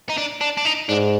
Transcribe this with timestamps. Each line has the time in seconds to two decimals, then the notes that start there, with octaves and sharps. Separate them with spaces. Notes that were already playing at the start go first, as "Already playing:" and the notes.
0.09 D#4
0.17 D4
0.41 D4
0.57 D4
0.65 D#4
0.89 G#2 D4